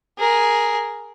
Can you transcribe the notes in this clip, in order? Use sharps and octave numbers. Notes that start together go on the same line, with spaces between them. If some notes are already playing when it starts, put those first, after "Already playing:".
G#4 A#4